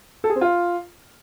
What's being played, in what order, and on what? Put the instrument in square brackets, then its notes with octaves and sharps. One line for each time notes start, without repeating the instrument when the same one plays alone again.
[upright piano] A4
G#4
C4
F4